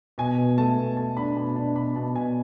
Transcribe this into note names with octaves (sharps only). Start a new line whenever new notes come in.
B2 G#5
B2
A3 A5
B2
A3 A5
D4 B5
B2 B5
D4 A5
B2 B5
B2 A5
B2 G#5